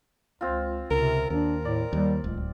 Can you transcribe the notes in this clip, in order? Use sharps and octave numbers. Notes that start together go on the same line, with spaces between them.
C#2 C4 F4
C#2 C3 A#4
D#2 D4 A#4
A2 D5
D#2 G3
D1 C#2